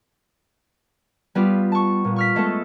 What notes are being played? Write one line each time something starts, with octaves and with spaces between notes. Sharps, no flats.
G3 B3 F4 G4
A5 C#6
A#2 B3
C#6 F6 B6
G#3 A3 B3 A4